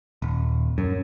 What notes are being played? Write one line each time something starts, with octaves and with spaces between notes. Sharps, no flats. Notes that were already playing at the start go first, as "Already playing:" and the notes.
D#1
F#2